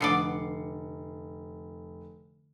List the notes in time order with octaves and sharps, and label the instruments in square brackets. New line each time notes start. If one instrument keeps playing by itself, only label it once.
[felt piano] F1 C7 C#7 [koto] D3 B3 D5